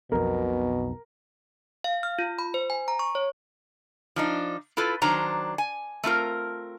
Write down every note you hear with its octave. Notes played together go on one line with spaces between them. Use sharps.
B1 F2 B2 B3 A#4
F5
F6
F4
B5
C5
G#5
A#5
C#6
C#5
F3 D4 D#4
E4 F4 A4 B4
D#3 F#3 D4 C5 A#5
G#5
A3 C4 F4 A#4